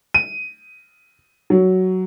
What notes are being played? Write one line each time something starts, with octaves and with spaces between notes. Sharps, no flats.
D#7
F#3